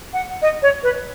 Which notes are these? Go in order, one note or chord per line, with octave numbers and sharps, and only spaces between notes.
F#5
D#5
C#5
B4